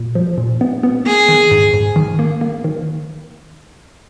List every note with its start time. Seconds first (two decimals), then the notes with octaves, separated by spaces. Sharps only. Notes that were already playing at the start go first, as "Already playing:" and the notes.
Already playing: A#2
0.15 F3
0.38 A#2
0.61 B3
0.83 B3
1.06 A#3 G#4
1.29 D#3
1.51 G#2
1.74 G#2
1.96 D#3
2.19 A#3
2.41 A#3
2.64 D#3